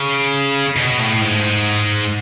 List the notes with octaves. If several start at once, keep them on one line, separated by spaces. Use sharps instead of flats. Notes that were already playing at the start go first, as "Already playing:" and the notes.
Already playing: C#3
B2
A2
G#2